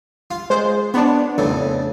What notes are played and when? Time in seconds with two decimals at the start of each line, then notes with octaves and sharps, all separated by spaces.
0.31 F4
0.50 G#3 C5
0.94 B3 D4 C#5
1.38 F2 A2 C#3